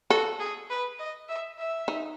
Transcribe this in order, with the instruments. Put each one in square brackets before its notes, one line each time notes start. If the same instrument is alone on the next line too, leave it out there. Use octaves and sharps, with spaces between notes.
[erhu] F#4 [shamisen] A4
[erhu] G#4
B4
D#5
E5
E5
[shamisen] D#4